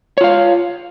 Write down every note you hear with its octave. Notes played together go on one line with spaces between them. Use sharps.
F4 C#5 F5